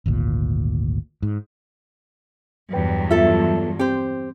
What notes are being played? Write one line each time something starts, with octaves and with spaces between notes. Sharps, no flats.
G#1 D2 A#2
G#2
E2 G2 F#3 B4 G5
B3 F4 A4 E5
C4 G4 C5